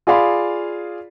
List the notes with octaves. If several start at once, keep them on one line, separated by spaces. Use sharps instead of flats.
F4 G#4 D5 F5 B5 C6